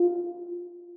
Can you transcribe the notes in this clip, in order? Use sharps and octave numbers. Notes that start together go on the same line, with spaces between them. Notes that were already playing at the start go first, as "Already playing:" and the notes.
Already playing: F4